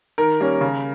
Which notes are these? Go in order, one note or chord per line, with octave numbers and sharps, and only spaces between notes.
D#3 A#4
G3 A#3 C#4
C#3